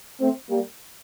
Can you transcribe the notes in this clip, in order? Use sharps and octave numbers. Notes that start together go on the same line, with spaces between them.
A3 C4
G3 A#3